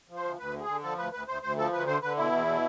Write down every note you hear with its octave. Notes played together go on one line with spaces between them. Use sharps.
F3
C5
D2
D2 B4
D3
G#4
D3
F3 A4
D2 B4
D2 B4
D2 C5
D2 C5
F3 A4
D2 B4
D3 C5
D3 B4
B2 E4
E2
B2